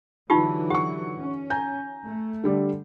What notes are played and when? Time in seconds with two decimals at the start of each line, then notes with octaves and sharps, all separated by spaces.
0.30 D3 E3 F#3 D#4 F4 G4
0.70 G4 F#5 C#6
1.18 C#4
1.50 G#5 A#5 G6
2.05 A3
2.44 D3 G3 D5